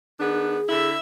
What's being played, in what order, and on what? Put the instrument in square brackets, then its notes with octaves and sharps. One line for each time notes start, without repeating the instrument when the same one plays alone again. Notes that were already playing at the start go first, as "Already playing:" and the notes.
[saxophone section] D#3 B3 D4 [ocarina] G#4
[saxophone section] D3 E4 [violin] E5